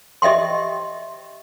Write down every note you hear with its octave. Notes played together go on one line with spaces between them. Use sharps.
G4 D#5 E5 G5 C6